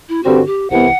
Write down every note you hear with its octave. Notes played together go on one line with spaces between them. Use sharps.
E4
G2 D3 G3 C4 F#4
G4
C2 C3 E3 B3 F#5